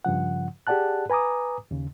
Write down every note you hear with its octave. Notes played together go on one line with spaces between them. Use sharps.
G2 C#3 F3 F#5
G4 G#4 D5 F#5 A5 F#6
B4 G#5 A#5 D6 D#6
D#2 C#3